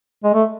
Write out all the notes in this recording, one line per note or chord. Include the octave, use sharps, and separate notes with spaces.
G#3
A3